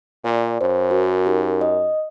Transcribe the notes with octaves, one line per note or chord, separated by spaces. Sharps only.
A#2 D5
F#2 C5
F#4 A#4
D#4 G4 A#4
D#5